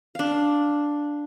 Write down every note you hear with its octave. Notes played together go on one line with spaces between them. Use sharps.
D4 F5